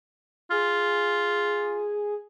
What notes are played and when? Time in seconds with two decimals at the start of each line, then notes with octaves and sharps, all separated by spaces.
0.51 F4 G#4